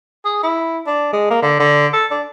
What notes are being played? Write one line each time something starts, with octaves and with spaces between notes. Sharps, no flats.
G#4
E4
D4
G#3
A#3
D3
D3
A4
D4